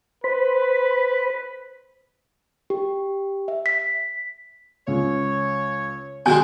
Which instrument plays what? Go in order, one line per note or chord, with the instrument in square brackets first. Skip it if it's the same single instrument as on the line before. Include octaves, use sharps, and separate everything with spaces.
[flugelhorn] B4 [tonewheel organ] C5 B5
[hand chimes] G4
E5
B6
[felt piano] C#2 [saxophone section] C#5
[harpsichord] B2 D#3 G#3 [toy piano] G#5 [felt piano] C6 F#6 G6